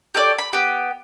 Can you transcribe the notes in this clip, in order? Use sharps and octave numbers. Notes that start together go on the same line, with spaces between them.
G4 A4 C#5 D5
B5
B3 G4